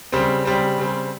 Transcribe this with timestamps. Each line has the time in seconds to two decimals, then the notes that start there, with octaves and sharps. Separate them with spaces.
0.12 C#3 G3 C4
0.45 C#3 G3 C4
0.78 C#3 G3 C4